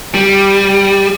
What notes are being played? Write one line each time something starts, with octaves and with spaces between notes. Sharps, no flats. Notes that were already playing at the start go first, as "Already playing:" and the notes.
G3